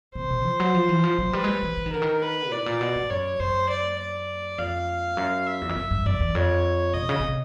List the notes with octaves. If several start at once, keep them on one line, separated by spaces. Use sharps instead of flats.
C3 C5
B2
F3
F#3
F3
E3
F3
F#3
G3 B4
G#3
G3
E3
E3
D#3
D3 A#4
D#3
B4
A2 D5
A#2
B2
A2
F#2 C#5
F#2 C5
D5
D5
F2 F5
F#2
E5
E2
F2
F#2
G2
F#2 D5
E2
F2 C#5
B2 D#5
C#3
C3